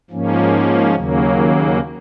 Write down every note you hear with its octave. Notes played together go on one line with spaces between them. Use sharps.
G#2 F3 A#3 C#4
D#2 C#3 F#3 A#3